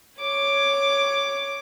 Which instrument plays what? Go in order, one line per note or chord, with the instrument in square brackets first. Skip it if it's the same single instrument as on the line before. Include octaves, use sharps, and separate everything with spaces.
[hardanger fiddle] C#5 D6